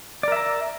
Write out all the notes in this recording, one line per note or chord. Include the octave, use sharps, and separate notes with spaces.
A#4 D5 E5 A#5